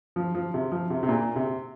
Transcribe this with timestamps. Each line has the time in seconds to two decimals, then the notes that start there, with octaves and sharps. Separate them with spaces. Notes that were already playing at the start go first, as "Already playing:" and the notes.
0.16 F3
0.35 F3
0.54 C3
0.71 F3
0.90 C3
1.03 C3
1.09 A#2
1.36 C3